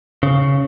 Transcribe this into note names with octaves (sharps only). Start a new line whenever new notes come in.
C#3